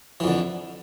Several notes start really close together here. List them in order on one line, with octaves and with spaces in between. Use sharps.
E3 F2 D3